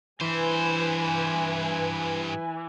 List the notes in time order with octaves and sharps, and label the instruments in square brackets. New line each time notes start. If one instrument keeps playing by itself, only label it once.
[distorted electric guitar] G2 C5 [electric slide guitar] E3 [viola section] B4 G#5